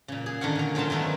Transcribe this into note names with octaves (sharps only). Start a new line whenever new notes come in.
A#2 C#3
G#4
D3 D#3 C#4 F#5
A#2 A#5
C#3 F#3 F4 C5 A5
D#3 F#3 A3 B3